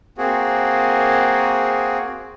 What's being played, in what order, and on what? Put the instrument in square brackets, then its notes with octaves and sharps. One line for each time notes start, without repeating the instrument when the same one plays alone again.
[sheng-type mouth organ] A#3 C4 F#4 G#4